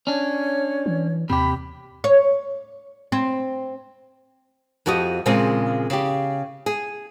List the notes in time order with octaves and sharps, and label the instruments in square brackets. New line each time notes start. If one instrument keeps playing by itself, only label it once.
[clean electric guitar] C#4 D4 [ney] C#5
[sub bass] E3
[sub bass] D#2 [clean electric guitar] C3 G4 [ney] B5
[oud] C#5
C4
[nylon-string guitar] F2 F3 F#4 G4 D#5
A#2 C#3 F3 G#3 C4
C#3 G4
G#4